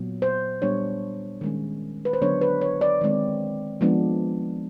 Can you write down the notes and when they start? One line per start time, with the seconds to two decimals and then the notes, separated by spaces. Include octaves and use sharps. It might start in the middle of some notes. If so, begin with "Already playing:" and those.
Already playing: A#2 F#3 B3
0.22 C5
0.62 A#2 G3 B3 D4 C#5
1.41 D#3 G#3 C#4
2.05 B4
2.13 C5
2.22 D3 F#3 B3 D4 C#5
2.41 B4
2.62 C#5
2.81 D5
3.01 D#3 G#3 C4
3.81 F3 G#3 B3 D4